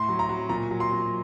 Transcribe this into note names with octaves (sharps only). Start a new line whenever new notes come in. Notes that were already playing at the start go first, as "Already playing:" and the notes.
Already playing: A2 C6
F#3
A#5
F#3
A#2 A#5
F#3
C6
F#3